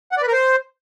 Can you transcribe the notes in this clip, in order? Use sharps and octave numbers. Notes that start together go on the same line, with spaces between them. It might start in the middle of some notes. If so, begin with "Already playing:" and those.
F#5
D5
B4
A#4
C5